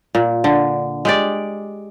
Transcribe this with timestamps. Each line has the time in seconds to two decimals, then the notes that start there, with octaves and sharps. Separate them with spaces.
0.15 A#2
0.44 D3
1.05 G#3 G4 D5